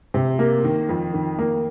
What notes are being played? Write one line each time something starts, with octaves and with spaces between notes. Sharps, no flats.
C3
A#3
D#3
F2
D#3
A#3